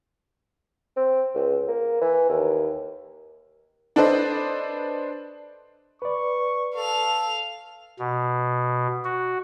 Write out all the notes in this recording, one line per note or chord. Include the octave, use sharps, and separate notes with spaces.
C4
C#2
A#3
E3
D#2
D4 A4 B4 C5 D5 D#5
B4 D5 C#6
A4 F5 F7
B2
F#4